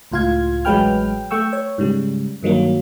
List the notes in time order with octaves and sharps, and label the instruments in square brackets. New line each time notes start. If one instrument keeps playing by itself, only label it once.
[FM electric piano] C#2 A2 F4 F5 G#6
A1 F#3 G#3 B4 G5 F6
A3 G5 C#6 E6
C#5
G#2 C#3 G3
G2 D#3 F#3 A#3